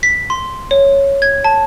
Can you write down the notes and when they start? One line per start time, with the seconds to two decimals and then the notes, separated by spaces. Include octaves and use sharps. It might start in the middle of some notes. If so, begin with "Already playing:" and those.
0.03 B6
0.30 C6
0.71 C#5
1.22 G#6
1.44 A5